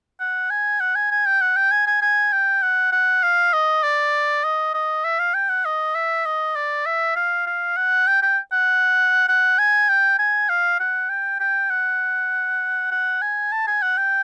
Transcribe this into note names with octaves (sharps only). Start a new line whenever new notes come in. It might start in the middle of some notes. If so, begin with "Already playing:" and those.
F#5
G#5
F#5
G#5
G#5
G5
F#5
G5
G#5
G#5
G#5
G5
F#5
F#5
F5
D#5
D5
D#5
D#5
E5
F5
G5
F#5
D#5
E5
D#5
D5
E5
F5
F5
F#5
G5
G5
F#5
F#5
G#5
G5
G#5
F5
F#5
G5
G5
F#5
F#5
G#5
A5
G#5
F#5
G5